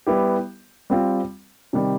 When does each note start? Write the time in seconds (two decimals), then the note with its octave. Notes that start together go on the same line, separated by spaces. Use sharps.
0.07 G3 B3 E4 G4
0.90 G3 C4 F4
1.73 C3 D#3 G3